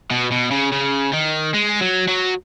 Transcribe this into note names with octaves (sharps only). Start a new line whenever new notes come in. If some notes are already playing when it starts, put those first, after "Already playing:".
B2
B2
C#3
C#3
D#3
G#3
F#3
F#3